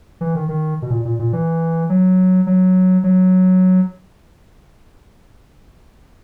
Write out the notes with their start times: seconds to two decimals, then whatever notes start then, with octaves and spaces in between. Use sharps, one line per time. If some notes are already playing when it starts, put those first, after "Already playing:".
0.21 E3
0.35 D#3
0.49 D#3
0.82 B2
0.91 A#2
1.05 A#2
1.19 A#2
1.33 E3
1.90 F#3
2.47 F#3
3.04 F#3